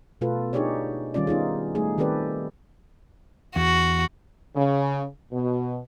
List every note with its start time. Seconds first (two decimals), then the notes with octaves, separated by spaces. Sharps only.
0.21 B2 A3 F4 A4 B4
0.53 D4 D#4 G4 G#4 C#5 D5
1.14 D#3 G3 C#4 F4 D5
1.27 B3 D#4 F4 G#4
1.75 G3 A3 D#4 G#4
1.98 D#3 C4 G4 A4 B4 D5
3.56 E2 F#4
4.56 C#3
5.33 B2